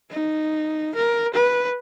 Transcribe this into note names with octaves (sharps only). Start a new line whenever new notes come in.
D#4
A#4
B4